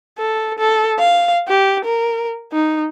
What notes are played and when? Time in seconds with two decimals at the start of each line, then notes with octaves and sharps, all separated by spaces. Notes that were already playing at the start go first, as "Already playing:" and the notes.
0.18 A4
0.58 A4
0.98 F5
1.48 G4
1.85 A#4
2.52 D#4